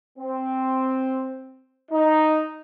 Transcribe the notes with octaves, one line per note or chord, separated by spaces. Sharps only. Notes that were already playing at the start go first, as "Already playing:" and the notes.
C4
D#4